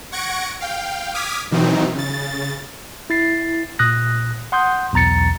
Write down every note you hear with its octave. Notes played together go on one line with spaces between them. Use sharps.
F#5 C#6 G#6 A#6 C#7 D7
F5 G5
D6 D#6 F6 G#6 B6
B2 D#3 E3 F#3 C4 D#4
C#3 A6
E4 A6 C7
A#2 D#6 F#6 A#6
F#5 C6 D#6 G6
B1 E2 A#5 A6 C#7